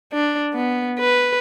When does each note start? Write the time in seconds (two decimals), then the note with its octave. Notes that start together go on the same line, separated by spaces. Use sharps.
0.13 D4
0.54 B3
1.00 B4